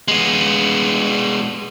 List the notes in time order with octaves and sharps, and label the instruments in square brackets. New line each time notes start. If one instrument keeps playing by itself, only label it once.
[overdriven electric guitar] G#3 B3